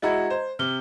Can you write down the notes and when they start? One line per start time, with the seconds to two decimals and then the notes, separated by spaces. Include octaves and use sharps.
0.02 G#3 E4 F#4 D#5 A#5 G#6
0.30 C5
0.59 C3 F6 G7